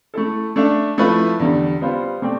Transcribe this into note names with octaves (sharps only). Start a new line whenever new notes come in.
A3 E4 A4
A3 D4 A4 E5
F3 A3 E4 B4 E5
E2 D3 G3
G3 B3 F4 C5
B2 A3 C4 G4 D5